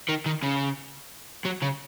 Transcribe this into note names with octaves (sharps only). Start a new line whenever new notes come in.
D#3
D#3
C#3
F#3
C#3